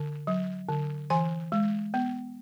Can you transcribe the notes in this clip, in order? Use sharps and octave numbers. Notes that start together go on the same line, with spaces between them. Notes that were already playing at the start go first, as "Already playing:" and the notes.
Already playing: D3
F#3
D3
E3 G#5
G#3
B3